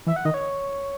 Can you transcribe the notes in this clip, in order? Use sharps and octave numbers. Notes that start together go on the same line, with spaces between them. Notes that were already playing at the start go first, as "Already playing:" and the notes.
E3 E5
F#5
D#3 D#5
C#5